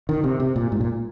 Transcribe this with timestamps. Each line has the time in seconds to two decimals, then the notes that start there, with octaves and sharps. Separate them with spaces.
0.09 D#3
0.24 C3
0.40 C3
0.56 A#2
0.72 G#2
0.81 A#2